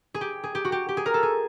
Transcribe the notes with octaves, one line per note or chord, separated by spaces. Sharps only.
G#4
G4
G#4
G4
F#4
G4
G4
G#4
A#4
A4
G#4